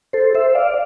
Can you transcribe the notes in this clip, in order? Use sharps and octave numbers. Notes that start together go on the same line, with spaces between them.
A4 C5
C5 E5
D5 F5